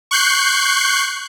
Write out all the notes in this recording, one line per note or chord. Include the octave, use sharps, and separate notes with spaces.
C#6 F#6 G6 C7